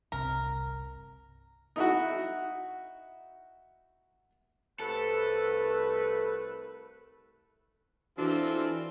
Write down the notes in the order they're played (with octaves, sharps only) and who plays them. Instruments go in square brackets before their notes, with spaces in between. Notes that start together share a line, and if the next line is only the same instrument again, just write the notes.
[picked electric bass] G1 C2 C3 [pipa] A#4
[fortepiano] D#4 E4 F#4
[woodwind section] C2 A3 B4 [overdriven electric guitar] A4
[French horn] E3 [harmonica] C4 F4 A4 [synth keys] D4 [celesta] F#4